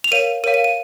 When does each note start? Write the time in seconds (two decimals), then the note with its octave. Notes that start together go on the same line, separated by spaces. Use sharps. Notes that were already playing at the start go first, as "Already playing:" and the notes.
0.04 F7
0.12 A#4 C#5 F5 D#7
0.44 A#4 C#5 F5 D#7
0.54 D#7
0.64 D#7